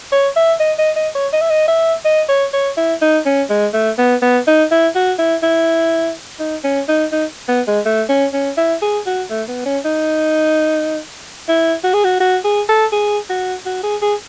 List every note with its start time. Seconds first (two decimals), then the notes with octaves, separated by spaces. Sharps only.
0.12 C#5
0.36 E5
0.60 D#5
0.78 D#5
0.96 D#5
1.15 C#5
1.33 D#5
1.41 E5
1.50 D#5
1.68 E5
2.05 D#5
2.29 C#5
2.53 C#5
2.77 E4
3.02 D#4
3.26 C#4
3.50 G#3
3.74 A3
3.98 B3
4.22 B3
4.47 D#4
4.71 E4
4.95 F#4
5.19 E4
5.43 E4
6.39 D#4
6.64 C#4
6.88 D#4
7.12 D#4
7.49 B3
7.67 G#3
7.86 A3
8.09 C#4
8.33 C#4
8.58 E4
8.82 G#4
9.07 F#4
9.30 A3
9.48 B3
9.66 C#4
9.85 D#4
11.48 E4
11.84 F#4
11.94 G#4
12.04 F#4
12.20 F#4
12.44 G#4
12.69 A4
12.92 G#4
13.30 F#4
13.66 F#4
13.83 G#4
14.02 G#4